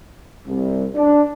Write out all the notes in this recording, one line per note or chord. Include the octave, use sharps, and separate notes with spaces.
C2
D4